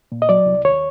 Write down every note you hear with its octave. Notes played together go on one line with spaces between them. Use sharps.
A#2
D#5
F#3 D5
C2
D#2 C#5